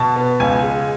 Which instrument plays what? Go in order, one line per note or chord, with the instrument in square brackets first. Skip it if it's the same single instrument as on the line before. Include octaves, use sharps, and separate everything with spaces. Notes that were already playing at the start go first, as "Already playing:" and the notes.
Already playing: [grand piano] B2 A5
B3
C#2 G#5
G#3